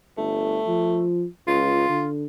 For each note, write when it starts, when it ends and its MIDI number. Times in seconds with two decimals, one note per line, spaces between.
0.18 0.59 31
0.18 1.06 57
0.67 1.24 53
1.47 1.89 37
1.47 2.07 65
1.89 2.27 50